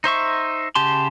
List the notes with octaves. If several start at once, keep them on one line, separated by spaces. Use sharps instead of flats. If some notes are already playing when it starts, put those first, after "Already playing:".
D#4 C5 E5 C#6
C#3 G4 A5 C6